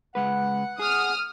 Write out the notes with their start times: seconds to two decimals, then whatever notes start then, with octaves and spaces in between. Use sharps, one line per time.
0.15 C#2 G#3 B4 F#5
0.79 G#4 D#6 F6